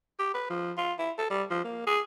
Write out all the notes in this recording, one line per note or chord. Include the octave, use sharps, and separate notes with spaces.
G4
B4
F3
F4
E4
A4
G3
F3
A#3
G#4